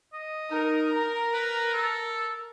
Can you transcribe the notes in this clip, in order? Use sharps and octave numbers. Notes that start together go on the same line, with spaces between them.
D#5
D#4 A#4
A#5
B4
A4